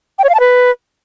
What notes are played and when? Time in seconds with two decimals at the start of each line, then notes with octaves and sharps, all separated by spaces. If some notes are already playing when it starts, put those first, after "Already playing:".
0.19 G5
0.24 C#5
0.29 F5
0.35 A5
0.40 B4